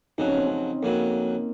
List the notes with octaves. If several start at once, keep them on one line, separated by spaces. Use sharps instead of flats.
F2 C#3 F#3 D#4
C#4
C4
C#4
F2 C#3 F#3 A#3